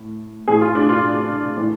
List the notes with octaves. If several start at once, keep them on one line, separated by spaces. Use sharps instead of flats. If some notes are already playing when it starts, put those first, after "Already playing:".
Already playing: A2
A2 E3 G#4
F4
D4
F4
A2 E3